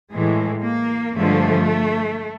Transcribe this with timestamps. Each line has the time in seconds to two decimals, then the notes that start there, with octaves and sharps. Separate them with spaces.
0.11 A2 E3 G#3
0.63 A#3
1.15 G2 D3 F3 G#3 A3